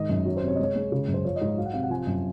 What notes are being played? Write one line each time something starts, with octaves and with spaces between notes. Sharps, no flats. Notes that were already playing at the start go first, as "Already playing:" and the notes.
Already playing: G#2 D#3 D#5
F#2
F#3 C#5
C5
C3 C#5
D#5
G#3 C#5
G#3
C#3
F#2
C5
F3 C#5
D#5
G#2
F#3 F5
F#5
C3 F5
F#5
F3 G#5
F#2